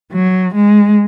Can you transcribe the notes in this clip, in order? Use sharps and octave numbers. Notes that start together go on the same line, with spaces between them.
F#3
G#3